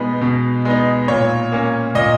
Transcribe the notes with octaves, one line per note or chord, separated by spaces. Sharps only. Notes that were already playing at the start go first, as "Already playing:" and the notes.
Already playing: B2 G#3 B3 D#4
B2
G#3 B3 D#4
A#2 C#5
A#3 C#4
A#2 D#5